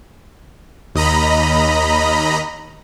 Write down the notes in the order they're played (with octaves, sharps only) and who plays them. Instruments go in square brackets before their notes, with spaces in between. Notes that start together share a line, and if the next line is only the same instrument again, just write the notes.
[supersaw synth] D#2 D#5 A#5 B5